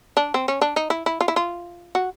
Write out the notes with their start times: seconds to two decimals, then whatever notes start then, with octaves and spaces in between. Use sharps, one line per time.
0.17 D4
0.34 C4
0.48 C#4
0.61 D4
0.76 D#4
0.90 E4
1.06 E4
1.21 F4
1.28 E4
1.36 F4
1.95 F#4